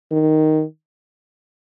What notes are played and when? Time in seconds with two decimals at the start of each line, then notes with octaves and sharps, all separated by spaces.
0.11 D#3